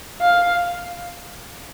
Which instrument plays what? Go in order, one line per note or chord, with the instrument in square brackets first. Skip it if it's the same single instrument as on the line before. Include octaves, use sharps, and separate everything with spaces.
[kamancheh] F5